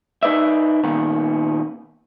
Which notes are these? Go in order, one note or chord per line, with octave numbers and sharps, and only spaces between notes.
D#4 B4 D5 E5
A#2 D#3 B3